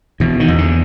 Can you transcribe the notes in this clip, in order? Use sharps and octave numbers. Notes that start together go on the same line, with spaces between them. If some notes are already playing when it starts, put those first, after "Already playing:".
B2 E3
D#3
E2
D3